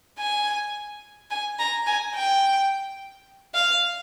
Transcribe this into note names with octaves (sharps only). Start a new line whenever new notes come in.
G#5
G#5
A#5
G#5
G5
F5